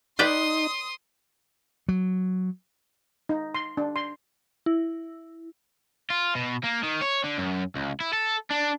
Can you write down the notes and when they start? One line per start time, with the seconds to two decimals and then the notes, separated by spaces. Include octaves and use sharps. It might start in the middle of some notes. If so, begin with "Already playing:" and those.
0.19 D#4 B4 D5 G5 C6 D#6
1.88 F#3
3.29 D#4
3.55 C6
3.77 D4
3.96 C6
4.66 E4
6.10 F4
6.35 B2
6.64 A#3
6.83 D#3
7.01 C#5
7.24 D3
7.38 F#2
7.75 C#2
8.00 E4
8.13 A4
8.51 D4